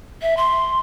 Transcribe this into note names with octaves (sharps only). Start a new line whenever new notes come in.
E5
C6